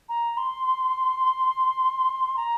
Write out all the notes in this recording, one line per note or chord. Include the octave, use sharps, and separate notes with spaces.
A#5
C6
A#5